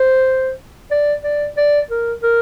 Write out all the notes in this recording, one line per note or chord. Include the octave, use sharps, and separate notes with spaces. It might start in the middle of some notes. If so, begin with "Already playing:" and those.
Already playing: C5
D5
D5
D5
A#4
A#4